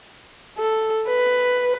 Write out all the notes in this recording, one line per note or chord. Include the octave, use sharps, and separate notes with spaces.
A4
B4